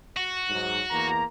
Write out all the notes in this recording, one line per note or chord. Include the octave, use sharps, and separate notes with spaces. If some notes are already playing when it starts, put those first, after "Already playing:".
F#4
G#2 F#3
E2 A#3 A#5